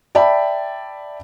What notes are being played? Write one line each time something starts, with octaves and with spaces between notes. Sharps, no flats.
D5 E5 G5 A5 B5